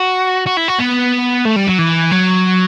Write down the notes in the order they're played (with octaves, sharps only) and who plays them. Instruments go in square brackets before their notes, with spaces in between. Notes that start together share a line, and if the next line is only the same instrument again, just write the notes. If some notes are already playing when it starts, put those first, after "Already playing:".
Already playing: [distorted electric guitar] F#4
F#4
E4
F#4
B3
A3
G3
F#3
E3
F#3